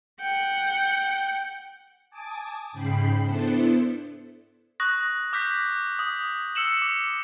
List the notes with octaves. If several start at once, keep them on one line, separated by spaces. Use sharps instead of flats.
F#5 G5
G#5 A5 D6 D#6
G#2 C#3 G5 B5 C7
B3 D4 E4 A4 C5
C#6 D#6 F#6 A#6
D6 F6 G6 A#6 B6
D#6
E6 C#7 E7 F#7
D6 E7